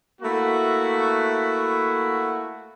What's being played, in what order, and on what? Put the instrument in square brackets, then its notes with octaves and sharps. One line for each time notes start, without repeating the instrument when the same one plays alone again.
[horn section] A3 A#3 E4 F#4